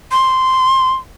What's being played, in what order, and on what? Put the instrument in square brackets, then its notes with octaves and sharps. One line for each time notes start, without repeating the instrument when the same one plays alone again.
[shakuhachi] C6